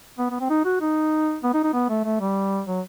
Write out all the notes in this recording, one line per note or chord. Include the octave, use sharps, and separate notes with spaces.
B3
B3
C4
D#4
F#4
D#4
B3
D#4
D#4
B3
A3
A3
G3
F#3